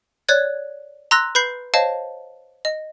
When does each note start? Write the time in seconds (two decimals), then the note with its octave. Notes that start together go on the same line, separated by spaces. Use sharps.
0.29 C#5 D5 F#6 G#6
1.11 A#5 C6 E6 F#6 A#6
1.35 B4 B5 G6 C7
1.74 C5 C#5 D#5 F5 A5
2.65 D#5